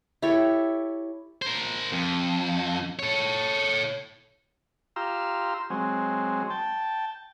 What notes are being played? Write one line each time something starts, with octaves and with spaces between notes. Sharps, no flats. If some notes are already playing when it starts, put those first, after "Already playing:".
E4 G4 A4 C#5
A#4 C5
F2
A4 C#5
F4 G4 A#5 C6 E6
F#3 G#3 C4
G5 A5